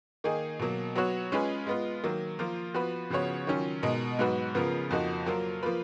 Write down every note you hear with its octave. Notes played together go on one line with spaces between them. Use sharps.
D#3 A#3 D#4 G#4
B2 F#3 A#3
F#3 B3 F#4 C#5
G#3 C#4 F4 G#4 B4
G#3 B3 F4
D#3 F#3 A#3
F3 A#3 F4 A#4
F3 B3 F#4 B4
C#3 F3 B3 F#4 C#5
D#3 F#3 C#4 F4
B2 G#3 D#4 A#4 D#5
G#2 F#3 B3 F#4 B4
C#3 F3 B3 F4 A#4
F2 F3 A#3 D#4 F#4
F#3 A#3 F4 A#4
F3 A#3 F4 B4